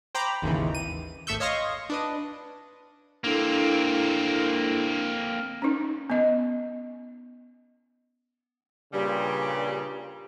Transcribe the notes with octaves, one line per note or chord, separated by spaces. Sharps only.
C5 G5 A#5 B5 D6
G#1 D#2 C#3 E3
D#7
G#1 A3 E5 C#6 E6 G6
C#5 D#5 F5 C6 C#6 A#6
D4 B4 D#5
A#3 C4 D4 E4 A4
C#4 D#4
B3 D#5
G2 A#2 C#3 G3